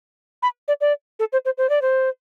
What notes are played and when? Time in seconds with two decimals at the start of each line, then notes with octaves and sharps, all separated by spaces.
0.42 B5
0.68 D5
0.81 D5
1.19 A4
1.33 C5
1.45 C5
1.58 C5
1.69 D5
1.82 C5